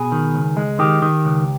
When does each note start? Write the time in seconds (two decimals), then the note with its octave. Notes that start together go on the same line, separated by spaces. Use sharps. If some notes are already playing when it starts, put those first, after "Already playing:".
Already playing: B2 G#4
0.12 D#3
0.34 C#2
0.57 G#3
0.79 D#3 G4
1.02 D#3
1.25 C#2